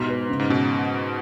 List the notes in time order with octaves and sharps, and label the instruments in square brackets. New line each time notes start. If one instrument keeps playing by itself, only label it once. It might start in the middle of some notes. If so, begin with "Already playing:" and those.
Already playing: [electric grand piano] G#2 [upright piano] B2 F#4
[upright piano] B4
C#3
[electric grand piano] G#2
[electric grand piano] B2 [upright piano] C#4